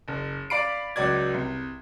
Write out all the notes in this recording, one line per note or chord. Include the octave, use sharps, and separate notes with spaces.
F#1
D5 F5 B5 C7 D7
C#2 F#3 D5 G#6
C2